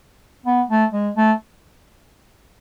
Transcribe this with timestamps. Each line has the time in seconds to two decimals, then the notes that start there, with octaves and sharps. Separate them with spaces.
0.46 B3
0.69 A3
0.93 G#3
1.16 A3